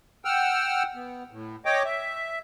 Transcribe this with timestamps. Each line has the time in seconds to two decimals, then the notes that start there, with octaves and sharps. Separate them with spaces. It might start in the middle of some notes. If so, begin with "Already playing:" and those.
0.25 F#5 G5 E6 F6
0.95 B3
1.31 A2
1.65 C#5 D#5 G5 D6
1.85 E5